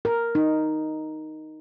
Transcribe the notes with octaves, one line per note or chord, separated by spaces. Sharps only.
A#4
D#4